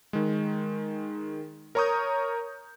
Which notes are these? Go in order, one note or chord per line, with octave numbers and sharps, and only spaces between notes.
D#3 G#3
A#4 C#5 A#5 C#6 D#6 G6